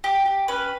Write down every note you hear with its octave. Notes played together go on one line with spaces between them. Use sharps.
G4
G4
C#4 B4